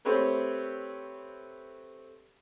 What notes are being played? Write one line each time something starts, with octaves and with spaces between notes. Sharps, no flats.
A3 C4 G4 B4 C#5